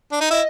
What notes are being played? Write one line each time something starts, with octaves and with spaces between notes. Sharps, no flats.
D4
D#4
E4 D#5